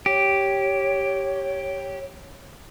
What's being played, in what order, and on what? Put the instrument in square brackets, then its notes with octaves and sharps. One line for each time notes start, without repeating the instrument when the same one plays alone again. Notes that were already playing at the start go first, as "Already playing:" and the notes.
[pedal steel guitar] G4 [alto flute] C#5